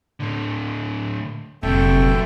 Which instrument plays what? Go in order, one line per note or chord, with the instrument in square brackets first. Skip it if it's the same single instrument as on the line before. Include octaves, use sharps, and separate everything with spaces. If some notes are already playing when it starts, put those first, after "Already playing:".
[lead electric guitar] A2 D3
[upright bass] F1 [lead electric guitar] A#2 F#3 [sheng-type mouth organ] A4 E5 G5